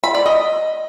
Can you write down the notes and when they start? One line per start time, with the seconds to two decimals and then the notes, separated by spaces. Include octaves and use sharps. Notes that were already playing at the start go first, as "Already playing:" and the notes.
0.04 B5
0.15 D5
0.26 D#5